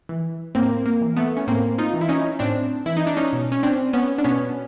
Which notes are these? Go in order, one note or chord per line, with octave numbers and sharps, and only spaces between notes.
E3
A2 A#3 C4
A#3
E3
A3 B3
C#4
A2 A#3 C4
D#4 F4
E3
E4
C#4 D#4
A2 C4 D4
E3 E4
D#4
D4
C#4 D#4
B2
C#4
C4 D4
B3 C#4
D4
B2 B3 C#4